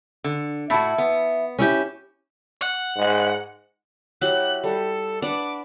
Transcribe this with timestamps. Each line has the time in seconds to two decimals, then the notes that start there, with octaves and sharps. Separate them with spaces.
0.24 D3
0.70 A2 E4 F#4 E5 A5
0.98 B3
1.59 C#4 E4 G4
2.62 F#5
2.97 G#2
4.21 F#3 E4 G4 F#6
4.64 G3 A4
5.22 D4 B4 F#5 D6